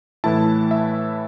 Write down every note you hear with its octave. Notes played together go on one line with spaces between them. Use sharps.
A2 E3 A3 E4 A5
E5